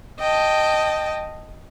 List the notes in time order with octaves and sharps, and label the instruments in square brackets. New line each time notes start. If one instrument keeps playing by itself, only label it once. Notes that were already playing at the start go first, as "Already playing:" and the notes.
[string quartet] D#5 G5 A5